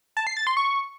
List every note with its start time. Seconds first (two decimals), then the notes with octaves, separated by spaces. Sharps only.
0.17 A5
0.27 C7
0.37 A6
0.47 C6
0.57 C#6